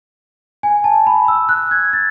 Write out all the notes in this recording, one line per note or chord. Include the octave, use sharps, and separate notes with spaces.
G#5
A5
B5
E6
F#6
G#6
A6